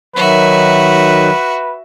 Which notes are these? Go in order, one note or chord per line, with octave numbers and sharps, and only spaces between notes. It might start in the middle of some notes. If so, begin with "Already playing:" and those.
D#3 F#3 F#4 B4 E5